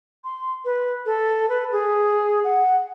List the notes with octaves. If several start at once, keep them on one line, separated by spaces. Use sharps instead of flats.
C6
B4
A4
B4
G#4
F#5